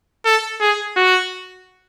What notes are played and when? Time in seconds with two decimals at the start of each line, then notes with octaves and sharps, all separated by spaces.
0.25 A4
0.61 G#4
0.97 F#4